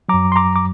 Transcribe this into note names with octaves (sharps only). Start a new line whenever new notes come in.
F#2 F#3 A#5 D6
C6
A#5 D6
D6